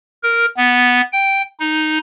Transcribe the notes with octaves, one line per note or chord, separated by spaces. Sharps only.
A#4
B3
G5
D#4